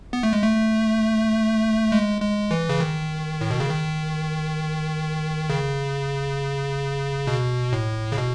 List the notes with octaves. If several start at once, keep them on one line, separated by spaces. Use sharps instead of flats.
B3
A3
G#3
A3
G#3
G#3
E3
C#3
D#3
A2
B2
C#3
D#3
C#3
B2
A2
C#3
B2